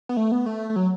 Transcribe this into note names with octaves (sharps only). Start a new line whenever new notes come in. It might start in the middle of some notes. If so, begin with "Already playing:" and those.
B3
A3
B3
A3
A3
F#3